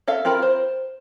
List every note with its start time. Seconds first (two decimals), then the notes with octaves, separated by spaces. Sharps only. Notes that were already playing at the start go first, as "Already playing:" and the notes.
0.08 A4 E5 F5
0.25 C4 F4 A#4 B5
0.42 C5